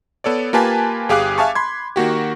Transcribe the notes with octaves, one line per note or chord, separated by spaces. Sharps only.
B3 A4 C#5 D5
A#3 F4 G4 B4 G#5 A5
G1 G4 G#4 F5 D6 F#6
E5 F5 G#5 A5 C#6
B5 C6 G#6
D#3 A#3 F#4 G4